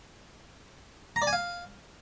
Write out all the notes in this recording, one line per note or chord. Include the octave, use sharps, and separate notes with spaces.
A#5
D5
G#5
F5